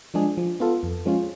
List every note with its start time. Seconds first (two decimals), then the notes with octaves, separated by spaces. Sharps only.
0.14 F3 G#3 D4 G#4
0.37 F3
0.60 B3 F4 A4
0.83 F2
1.05 F3 G#3 C#4 F4